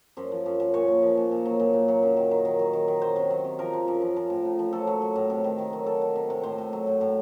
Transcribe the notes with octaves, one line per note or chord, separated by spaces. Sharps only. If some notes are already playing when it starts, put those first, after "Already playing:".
F#2 C5
F3
F#2
F#2
A#2 C#5
F3
F3
A#2
A#2
F#3
A#2
A#2
F#3
F#2
D#3
D#3
D#3
F#3
D#3
D#3
F#3 C5
C3
F#3
C3
F3 A#4
F3
F#2
F3
F3
A2
A2
F3
F#3 A4
F#3
F#3
A2
C3
D#3
D#3
F#3
F#3 A4
F#3
C3
C3
A2 C5
A2
F#3
A2
A2